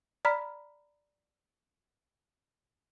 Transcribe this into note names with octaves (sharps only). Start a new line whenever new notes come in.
D5 A#5 B5 F6 B6